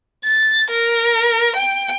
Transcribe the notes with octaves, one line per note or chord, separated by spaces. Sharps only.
A6
A#4
G5